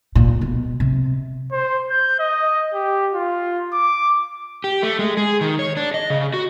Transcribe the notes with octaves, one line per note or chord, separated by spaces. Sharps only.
A#2
B2
C3
C5
G6
D#5
G4
F4
D6
G4
A3
G#3
G#4
D#3
C#5
D4
D#5
C#3
F#4